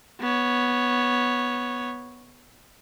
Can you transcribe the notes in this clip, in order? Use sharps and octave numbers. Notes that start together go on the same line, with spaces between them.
B3 C#5